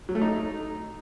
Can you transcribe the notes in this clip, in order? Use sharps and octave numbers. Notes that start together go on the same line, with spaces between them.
F#3
A3
D#4